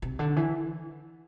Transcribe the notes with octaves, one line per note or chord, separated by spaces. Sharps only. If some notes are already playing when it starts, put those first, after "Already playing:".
C3
D3
E3